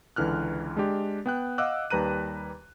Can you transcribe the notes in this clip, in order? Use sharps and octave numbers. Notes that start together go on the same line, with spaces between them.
C#2 D3 E3 F6 F#6
G#3 D4 G4
B3 G5 F#6
D#5 F5 F#5 D6 E6 F#6
D#2 G3 B4 A#5 F#6 D#7